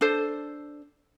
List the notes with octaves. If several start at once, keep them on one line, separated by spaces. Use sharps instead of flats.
D4 A4 C5